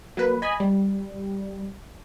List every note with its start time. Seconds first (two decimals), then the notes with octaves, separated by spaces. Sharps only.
0.17 F#3 A#3 B4
0.42 D#5 G#5 B5
0.60 G3